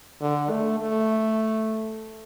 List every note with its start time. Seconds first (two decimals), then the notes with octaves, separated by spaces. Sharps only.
0.21 D3
0.50 A3
0.80 A3